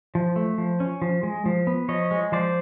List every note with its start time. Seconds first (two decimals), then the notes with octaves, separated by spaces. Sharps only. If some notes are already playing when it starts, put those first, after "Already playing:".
0.15 F3
0.36 A3
0.58 F3
0.80 C#4
1.02 F3
1.23 G#3
1.46 F3
1.67 B3
1.89 F3 C#5 D#5
2.11 G#3
2.32 F3 C5 D5